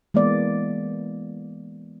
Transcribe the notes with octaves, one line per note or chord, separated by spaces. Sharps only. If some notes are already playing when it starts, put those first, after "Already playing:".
E3 G#3 A#3 B3 D5